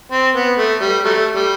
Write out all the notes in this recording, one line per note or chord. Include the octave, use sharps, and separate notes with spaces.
C4
B3
A3
G3
F#3 A3
G3